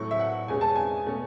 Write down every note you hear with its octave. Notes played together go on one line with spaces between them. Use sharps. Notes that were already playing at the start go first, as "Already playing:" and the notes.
Already playing: A2 F#3 A3 C#6
E5
F#5
E2 B2 G#3 C#4 G#5
A5
G#5
B2 A3 C#4